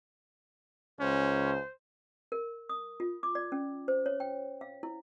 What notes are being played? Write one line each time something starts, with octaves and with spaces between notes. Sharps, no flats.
C#2 C#4 C5
A#4
D#6
F4
D6
D5
C#4
C5
C#5
G5
F5
E4